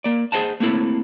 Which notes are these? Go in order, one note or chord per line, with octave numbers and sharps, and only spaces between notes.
A#3 D5
G#4 C5 D#5 F#5 A5
A3 A#3 C4 E4 A4